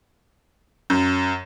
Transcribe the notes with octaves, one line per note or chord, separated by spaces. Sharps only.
F#2